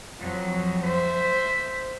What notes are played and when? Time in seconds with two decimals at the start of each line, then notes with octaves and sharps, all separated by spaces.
0.19 F2 F#3
0.83 C5 E5